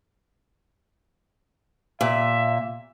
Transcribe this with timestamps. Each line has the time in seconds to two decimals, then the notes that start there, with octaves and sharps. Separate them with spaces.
2.01 A#2 E5